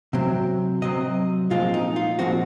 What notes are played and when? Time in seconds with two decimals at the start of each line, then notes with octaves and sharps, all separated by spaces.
0.13 C3 F#3 C4
0.82 C3 F#3 C4 D#5
1.50 A#2 F3 G#3 C4 F4
1.74 D#4
1.96 F4
2.19 A#2 F3 G#3 C4 F#4